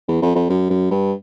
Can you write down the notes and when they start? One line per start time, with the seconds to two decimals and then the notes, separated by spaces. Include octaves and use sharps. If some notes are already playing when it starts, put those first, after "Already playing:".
0.08 E2
0.22 F2
0.35 F2
0.49 F#2
0.70 F#2
0.91 G2